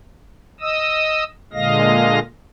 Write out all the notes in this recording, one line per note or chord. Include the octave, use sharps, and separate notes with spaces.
D#5 D#6 E6
A#2 D3 G#3 D#5 F5 A#6